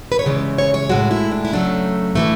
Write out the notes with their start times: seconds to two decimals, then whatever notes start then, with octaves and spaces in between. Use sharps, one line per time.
0.12 B4
0.19 C#5
0.26 C#3 E3 G#3 D5
0.58 C#5
0.74 C#5
0.89 A2 G#3 F#4
1.11 E4
1.31 D4
1.45 E4
1.53 C#3 F#3 A3 D4
2.15 A2 E3 A3